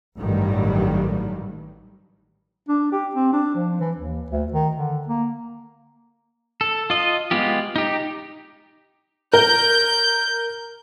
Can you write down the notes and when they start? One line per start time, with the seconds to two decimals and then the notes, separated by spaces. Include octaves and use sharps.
0.19 A1 G2 D#3 F#3 G3
2.68 D4
2.92 G4
3.15 C4
3.32 D4
3.55 F3
3.80 E3
3.97 D#2
4.30 D2
4.52 D#3
4.75 D3
5.07 A#3
6.61 A4
6.90 F4 D#5
7.31 G#3 B3 F4 G4
7.76 D#4 G4
9.33 A#4 G6